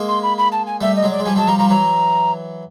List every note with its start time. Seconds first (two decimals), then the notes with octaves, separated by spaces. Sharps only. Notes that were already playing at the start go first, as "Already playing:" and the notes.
Already playing: G#3 A#3
0.08 C6
0.22 B5
0.37 B5
0.52 A5
0.66 G#5
0.81 G3 A3 E5
0.96 D#5
1.03 F#3 G#3
1.11 D5
1.19 G#3
1.25 F3 G3 G#5
1.36 F#3 G#3 A5
1.47 F3 G3 A#5
1.58 F3 G3 A#5
1.69 E3 F#3 A#5